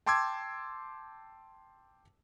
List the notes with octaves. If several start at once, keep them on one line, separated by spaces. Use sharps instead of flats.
G5 A5 C6 D6 E6 G#6